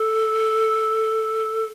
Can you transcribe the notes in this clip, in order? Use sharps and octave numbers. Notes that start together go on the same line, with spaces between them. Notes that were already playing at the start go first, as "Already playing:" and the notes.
Already playing: A4